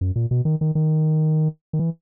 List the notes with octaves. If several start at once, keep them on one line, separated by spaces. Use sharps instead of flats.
F#2
A#2
B2
D#3
D#3
D#3
D#3
E3